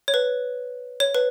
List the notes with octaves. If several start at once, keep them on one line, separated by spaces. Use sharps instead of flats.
C#5
B4
C#5
B4